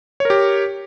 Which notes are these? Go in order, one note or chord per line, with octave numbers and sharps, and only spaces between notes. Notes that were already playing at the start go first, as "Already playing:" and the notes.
G4 A#4 C#5